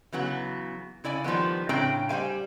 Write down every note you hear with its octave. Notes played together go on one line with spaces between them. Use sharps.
C#3 E3 F#3 B3
C#3 E4 D5 G#5
D#3 F3 G3 G#3 B3
A2 C#3 C4 D4 G5 A#5
G3 C5 F5 G#5